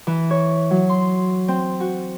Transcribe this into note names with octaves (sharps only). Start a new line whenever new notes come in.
E3
C#5
F#3
C6
C4
F#4